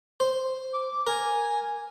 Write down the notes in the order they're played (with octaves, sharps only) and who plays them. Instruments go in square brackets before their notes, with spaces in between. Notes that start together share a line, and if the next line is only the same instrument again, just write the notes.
[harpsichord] C5
[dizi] D6
[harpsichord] A#4 [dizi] G#5